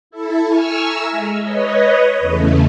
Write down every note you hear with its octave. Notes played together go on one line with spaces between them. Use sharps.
E4 A4
G#5 C#6 E6 F6
E5 A#5 E6
G#3
B4 C#5 D#5
E2 C#3 A3